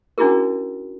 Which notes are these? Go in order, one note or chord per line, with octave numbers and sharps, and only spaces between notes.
C#4 D4 E4 F#4 G#4 A#4